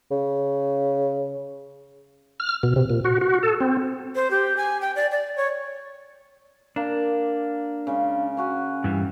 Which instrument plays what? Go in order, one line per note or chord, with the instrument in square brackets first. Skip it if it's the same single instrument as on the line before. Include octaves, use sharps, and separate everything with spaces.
[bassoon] C#3
[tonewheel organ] F6
B2
C3
A#2
F#4
F#4
A4
C4
[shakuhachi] C5
G4
G#5
G5
D5
D5
C#5
[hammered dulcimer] A#3 [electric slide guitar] D4
[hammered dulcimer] C#3 G#3
C#4 F#4 G#5
[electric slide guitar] G2 E3 G3